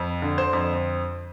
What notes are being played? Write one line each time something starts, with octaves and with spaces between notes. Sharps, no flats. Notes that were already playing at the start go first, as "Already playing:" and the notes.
Already playing: F2
D3
C5
F2